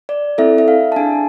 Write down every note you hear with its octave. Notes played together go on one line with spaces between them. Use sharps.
D5
C4 E4 A4 E5
E5
F5
A5
D4 G#4 G#5